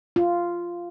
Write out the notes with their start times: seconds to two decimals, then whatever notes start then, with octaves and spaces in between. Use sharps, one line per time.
0.16 F4